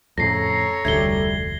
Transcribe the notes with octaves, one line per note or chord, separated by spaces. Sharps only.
F2 A2 C#3 A4 C#5 A#5 A#6 C7
F1 D2 D3 G3 A3 G#6 G7